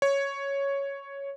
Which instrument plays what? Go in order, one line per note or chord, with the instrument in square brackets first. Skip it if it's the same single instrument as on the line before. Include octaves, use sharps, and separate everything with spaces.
[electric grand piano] C#5